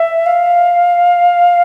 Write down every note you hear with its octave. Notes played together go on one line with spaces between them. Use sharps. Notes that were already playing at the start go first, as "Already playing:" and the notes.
Already playing: E5
F5